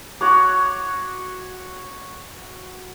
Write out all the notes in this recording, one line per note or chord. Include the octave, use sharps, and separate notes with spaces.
F#4 C#5 F#5 D6